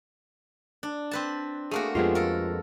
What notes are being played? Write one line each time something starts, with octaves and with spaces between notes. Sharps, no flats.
D4
C4 B4 A5
A3 A#3 F#4 G#4
F2 G#3 B3 F4 G4 G#4
A4 A#4